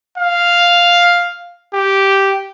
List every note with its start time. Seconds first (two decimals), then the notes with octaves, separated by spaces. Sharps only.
0.18 F5
1.73 G4